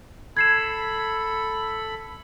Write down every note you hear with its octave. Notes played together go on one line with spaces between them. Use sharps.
A4 B5 G#6 C7 E7